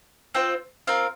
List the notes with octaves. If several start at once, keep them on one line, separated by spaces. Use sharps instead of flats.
C4 F4 C5 G5
C4 F4 A#4 F5